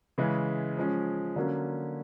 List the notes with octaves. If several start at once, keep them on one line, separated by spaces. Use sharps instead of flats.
C#3 E3 G#3 C#4
F3 G#3 C#4
D3 F#3 A#3 C#4